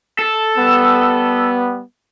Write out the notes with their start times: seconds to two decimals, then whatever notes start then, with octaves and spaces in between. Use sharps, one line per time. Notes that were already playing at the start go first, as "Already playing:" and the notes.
0.19 A4
0.57 G3 B3